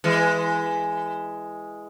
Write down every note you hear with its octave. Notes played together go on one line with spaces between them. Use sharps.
E3 G#3